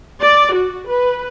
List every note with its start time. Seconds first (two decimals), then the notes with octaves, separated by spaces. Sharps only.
0.21 D5
0.53 F#4
0.87 B4